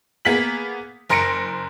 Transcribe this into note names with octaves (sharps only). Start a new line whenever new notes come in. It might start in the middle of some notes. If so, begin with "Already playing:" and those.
A#3 B3 G#4 B6 F#7
F#1 A#4 C6 A#6 C#7 D7